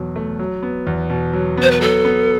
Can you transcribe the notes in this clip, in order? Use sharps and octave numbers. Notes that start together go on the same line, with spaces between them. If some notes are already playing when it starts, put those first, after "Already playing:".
Already playing: E2 B2 F#3
A3
F#3
B3
E2
B2
F#3
B3 C5
B4
F#3 A4
B3